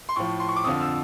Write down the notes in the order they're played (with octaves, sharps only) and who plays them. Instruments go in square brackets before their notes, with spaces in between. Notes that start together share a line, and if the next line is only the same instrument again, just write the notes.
[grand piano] C6
A2 F3 C#6
C6
C#6
D6
F2 D3 F3 D#6
E6